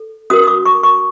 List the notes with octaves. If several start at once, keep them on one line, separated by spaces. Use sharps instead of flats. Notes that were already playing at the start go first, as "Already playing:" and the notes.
Already playing: A4
C#4 F#4 A#4 D#6
D#6
D6
C#6
C#6